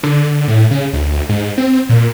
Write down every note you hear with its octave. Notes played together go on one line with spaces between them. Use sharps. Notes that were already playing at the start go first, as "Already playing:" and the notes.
D3
A2
C#3
D2
G#2
C4
A#2